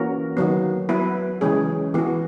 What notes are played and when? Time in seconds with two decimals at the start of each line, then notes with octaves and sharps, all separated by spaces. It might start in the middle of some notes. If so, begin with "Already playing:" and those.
Already playing: E3 A#3 C#4 F#4 A#4
0.37 D#3 F#3 B3
0.89 F#3 B3 E4 B4
1.41 C#3 E3 G#3 C#4 G#4
1.94 E3 B3 F#4